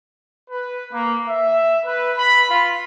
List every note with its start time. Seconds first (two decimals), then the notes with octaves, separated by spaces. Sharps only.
0.50 B4
0.93 A#3
1.28 E5
1.85 B4
2.18 B5
2.50 F4